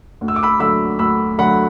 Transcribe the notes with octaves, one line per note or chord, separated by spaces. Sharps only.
D2
E6
D6
B5 E6
D3 F#3 A3 B5 E6
D2 B5 E6
D3 F#3 A3 F#5 B5